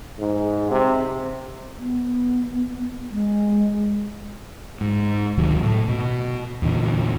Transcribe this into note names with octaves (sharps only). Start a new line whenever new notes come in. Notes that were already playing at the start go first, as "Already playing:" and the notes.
G#2
C3
B3
G#3
G#2
D2 C3 D#3 F#3
A2
B2
E2 A#2 D3